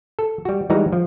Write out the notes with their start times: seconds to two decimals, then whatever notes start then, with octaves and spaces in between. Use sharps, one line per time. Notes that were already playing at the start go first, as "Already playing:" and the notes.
0.19 A4
0.45 G3 F#4
0.70 E3 G3 G#3 D#4 F#4 A#5
0.93 F3